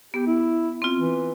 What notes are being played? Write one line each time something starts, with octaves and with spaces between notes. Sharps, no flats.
B3 G4
E4
C4 F4
E3